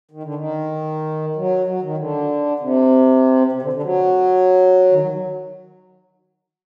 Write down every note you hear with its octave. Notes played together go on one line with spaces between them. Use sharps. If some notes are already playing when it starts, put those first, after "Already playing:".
D#3
D3
D#3
F#3
F#3
D#3
D3
C3
C3
D3
D3
F#3
D#3
F#3